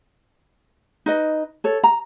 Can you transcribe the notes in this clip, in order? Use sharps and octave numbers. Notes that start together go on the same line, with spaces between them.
D#4 B4 D#5
A4 C#5
A#5